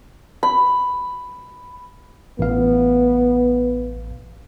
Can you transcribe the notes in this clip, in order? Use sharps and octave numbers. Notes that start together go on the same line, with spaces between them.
B5
A1 B3 F5